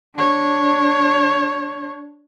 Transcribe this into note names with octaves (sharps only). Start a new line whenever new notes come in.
D4 C#5